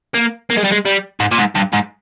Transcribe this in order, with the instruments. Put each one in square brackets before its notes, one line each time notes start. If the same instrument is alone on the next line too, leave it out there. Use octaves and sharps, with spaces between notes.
[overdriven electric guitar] A#3
A#3
G#3
G3
G#3
G3
G#2
A#2
G#2
G2
G#2